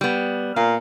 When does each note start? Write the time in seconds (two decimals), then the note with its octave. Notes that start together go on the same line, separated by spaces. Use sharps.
0.01 G3 B3
0.56 A#2 F5